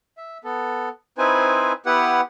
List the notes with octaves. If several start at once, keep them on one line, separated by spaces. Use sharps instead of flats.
E5
B3 A4
C4 D#4 E4 B4 C5 G#5
B3 E4 G4 B4 F#5